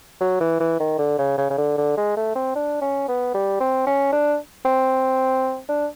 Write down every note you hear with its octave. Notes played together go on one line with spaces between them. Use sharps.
F#3
E3
E3
D#3
D3
C#3
C#3
C#3
D3
D3
G#3
A3
C4
D4
C#4
B3
G3
C4
C#4
D4
C4
D4